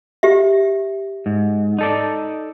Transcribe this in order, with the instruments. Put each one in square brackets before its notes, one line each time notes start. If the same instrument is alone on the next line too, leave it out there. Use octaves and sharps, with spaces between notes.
[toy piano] G4 E5
[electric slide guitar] G#2
D#4 A4 D5